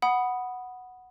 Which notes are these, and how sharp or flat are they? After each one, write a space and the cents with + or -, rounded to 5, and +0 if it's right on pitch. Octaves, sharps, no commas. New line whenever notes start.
F#5 +0 B5 -5 D#6 +0